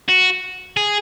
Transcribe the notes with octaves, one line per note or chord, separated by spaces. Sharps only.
F#4
G#4